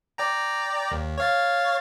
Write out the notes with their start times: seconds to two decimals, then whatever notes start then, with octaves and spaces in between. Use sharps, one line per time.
0.18 D5 G5 A#5
0.91 D#2
1.18 C#5 F5 A6